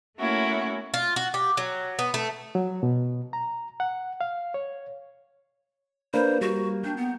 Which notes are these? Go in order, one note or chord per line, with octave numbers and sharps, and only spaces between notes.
A3 A#3 C#4 E4 F#4
F4
F#4
G4
F#3
B3
A3
F#3
B2
A#5
F#5
F5
C#5
A#3 D4 B4 C5
G3 F#4
D4 G5
B3